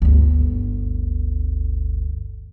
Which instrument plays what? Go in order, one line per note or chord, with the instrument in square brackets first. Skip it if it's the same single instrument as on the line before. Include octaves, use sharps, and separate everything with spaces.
[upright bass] G1 D2